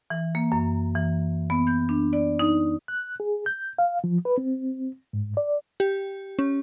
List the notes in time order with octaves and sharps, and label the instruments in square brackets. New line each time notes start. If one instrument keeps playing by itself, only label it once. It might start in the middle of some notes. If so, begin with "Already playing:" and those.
[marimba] E3
A#3
F#2
E3
B3
G6
D4
D5
D#4
[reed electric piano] F#6
G#4
G6
F5
F3
B4
C4
G#2
D5
[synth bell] G4
C#4